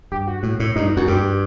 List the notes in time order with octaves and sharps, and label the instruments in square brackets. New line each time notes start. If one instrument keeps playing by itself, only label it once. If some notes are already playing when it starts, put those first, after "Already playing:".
[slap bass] G2 [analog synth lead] G4
[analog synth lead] F#4
[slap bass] A2
A2
[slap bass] G2 [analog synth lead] D#4
[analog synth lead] D#4
[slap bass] F#2 [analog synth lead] F#4
[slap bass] G2 [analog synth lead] G4